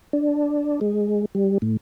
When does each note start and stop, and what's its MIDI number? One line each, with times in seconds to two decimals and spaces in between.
0.13 0.80 62
0.81 1.25 56
1.35 1.58 55
1.62 1.77 45